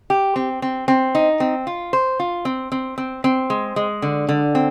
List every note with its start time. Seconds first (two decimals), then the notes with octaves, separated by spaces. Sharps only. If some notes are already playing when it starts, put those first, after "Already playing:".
0.10 G4
0.36 C4
0.62 C4
0.88 C4
1.15 D#4
1.40 C4
1.67 F4
1.93 C5
2.19 F4
2.45 C4
2.72 C4
2.98 C4
3.24 C4
3.50 G#3
3.76 G#3
4.02 D3
4.29 D3
4.55 C4